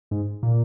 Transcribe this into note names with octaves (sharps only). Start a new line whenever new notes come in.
G#2
A#2